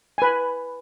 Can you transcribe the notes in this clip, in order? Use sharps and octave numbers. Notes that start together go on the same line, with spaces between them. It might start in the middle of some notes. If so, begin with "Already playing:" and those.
B4 G#5